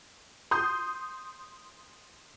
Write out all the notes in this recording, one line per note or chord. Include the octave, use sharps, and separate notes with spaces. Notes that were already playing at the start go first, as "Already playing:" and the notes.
C6 D#6 G6